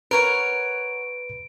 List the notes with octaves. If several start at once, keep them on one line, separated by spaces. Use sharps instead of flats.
A#4 B4 C#5 F#5 D7